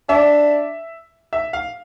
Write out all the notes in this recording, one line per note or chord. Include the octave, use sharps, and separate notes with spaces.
D4 E5
E5
F5